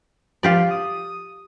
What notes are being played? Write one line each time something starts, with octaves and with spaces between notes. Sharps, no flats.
F3 F4 G4 D5
D#6